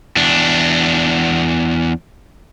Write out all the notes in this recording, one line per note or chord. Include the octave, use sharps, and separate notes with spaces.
E2 D4